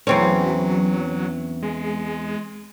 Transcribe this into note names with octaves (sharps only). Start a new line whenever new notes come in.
E2 F#3 C4 C#4
G#3